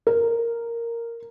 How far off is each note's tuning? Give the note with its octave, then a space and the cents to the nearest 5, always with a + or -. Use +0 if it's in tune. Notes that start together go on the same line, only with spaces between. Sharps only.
A#4 -5